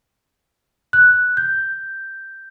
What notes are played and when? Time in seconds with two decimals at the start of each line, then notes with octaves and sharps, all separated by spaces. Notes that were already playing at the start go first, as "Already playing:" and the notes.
0.93 F#6
1.37 G6